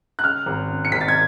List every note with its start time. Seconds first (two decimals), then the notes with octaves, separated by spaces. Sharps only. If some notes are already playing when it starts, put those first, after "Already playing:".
0.19 F#6
0.24 C#3 F6
0.46 G#1
0.70 C#3
0.85 C#7
0.92 G#1 B6
1.01 A6
1.08 G#6